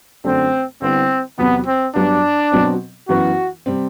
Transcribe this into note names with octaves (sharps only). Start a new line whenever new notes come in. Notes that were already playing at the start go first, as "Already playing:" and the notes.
F#2 D3 A3 C4 D4
D3 G3 B3 C4 E4
E2 C3 F#3 B3
C4
G2 F#3 B3 D4
B2 F#3 C4
F#2 E3 B3 E4 F#4
C3 G3 C4